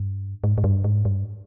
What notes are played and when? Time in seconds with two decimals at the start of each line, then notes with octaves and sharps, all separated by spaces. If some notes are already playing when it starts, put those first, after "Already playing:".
Already playing: G2
0.44 G#2
0.58 G#2
0.64 G2
0.84 G#2
1.05 G2